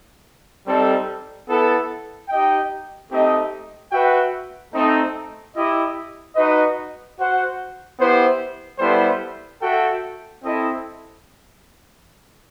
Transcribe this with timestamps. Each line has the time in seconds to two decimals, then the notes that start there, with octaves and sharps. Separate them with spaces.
0.65 G3 C4 D#4 A4
1.47 B3 E4 A4
2.29 D#4 G4 D#5 G5
3.10 A3 C4 D#4 G4 D#5
3.91 F#4 B4 E5 G5
4.72 A3 C4 D#4
5.54 E4 G4 D#5
6.36 D#4 F#4 B4 D#5
7.17 F#4 C5 F#5
7.98 B3 E4 G4 C5
8.79 G3 B3 E4 A4 C5
9.61 F#4 A4 E5 G5
10.42 C4 E4 A4 D#5